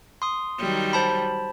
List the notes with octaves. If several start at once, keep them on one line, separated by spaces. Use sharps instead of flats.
C6 D#6
D#3 F#3 G3
C5 A5 B5